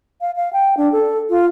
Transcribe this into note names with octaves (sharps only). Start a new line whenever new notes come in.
F5
F5
G5
D4
A4
F4